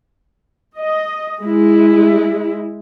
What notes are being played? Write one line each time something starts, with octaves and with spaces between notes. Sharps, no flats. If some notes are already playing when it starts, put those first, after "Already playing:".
D#5
G#3 E4